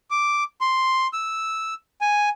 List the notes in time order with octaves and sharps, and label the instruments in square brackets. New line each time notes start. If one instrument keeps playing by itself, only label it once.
[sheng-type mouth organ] D6
C6
E6
G#5